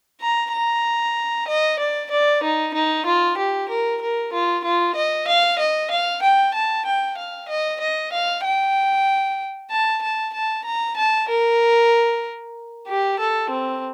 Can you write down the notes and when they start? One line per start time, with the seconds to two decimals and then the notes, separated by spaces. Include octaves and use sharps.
0.21 A#5
0.52 A#5
1.48 D#5
1.79 D5
2.11 D5
2.43 D#4
2.74 D#4
3.05 F4
3.37 G4
3.69 A#4
4.01 A#4
4.33 F4
4.64 F4
4.96 D#5
5.27 F5
5.59 D#5
5.90 F5
6.22 G5
6.54 A5
6.85 G5
7.17 F5
7.49 D#5
7.81 D#5
8.12 F5
8.44 G5
9.71 A5
10.02 A5
10.33 A5
10.65 A#5
10.97 A5
11.28 A#4
12.87 G4
13.19 A4
13.50 C4